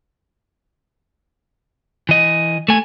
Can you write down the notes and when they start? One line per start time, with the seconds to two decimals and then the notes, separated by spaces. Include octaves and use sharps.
2.09 E3 D#5
2.68 A3 G#5